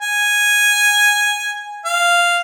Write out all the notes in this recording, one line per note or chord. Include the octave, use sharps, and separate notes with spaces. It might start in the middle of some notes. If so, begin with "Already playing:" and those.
G#5
F5